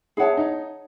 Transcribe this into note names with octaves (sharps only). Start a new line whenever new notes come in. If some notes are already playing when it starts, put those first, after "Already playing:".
E4 G#4 C#5 F#5 A5
D#4